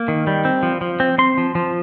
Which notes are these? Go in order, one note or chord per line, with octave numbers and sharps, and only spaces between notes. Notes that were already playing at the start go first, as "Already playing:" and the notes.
Already playing: A#3
D#3
G3
C4
F3
F3
C4
C4 C6
F3
F3